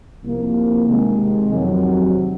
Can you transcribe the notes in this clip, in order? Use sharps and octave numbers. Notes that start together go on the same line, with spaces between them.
C2 C3 F3 A#3
C3 D#3 G#3
F2 C3 D#3 F#3